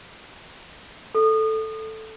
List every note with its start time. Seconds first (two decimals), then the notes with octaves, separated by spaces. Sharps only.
1.15 A4